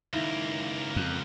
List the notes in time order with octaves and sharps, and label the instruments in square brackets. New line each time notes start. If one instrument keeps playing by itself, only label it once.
[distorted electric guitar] C#2 A#3 [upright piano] D#3 E4
[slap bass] F2